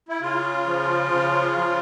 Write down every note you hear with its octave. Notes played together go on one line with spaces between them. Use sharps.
E4
C#3 F4
F3
C#3
F3